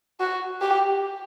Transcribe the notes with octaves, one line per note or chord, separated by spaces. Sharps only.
F#4
G4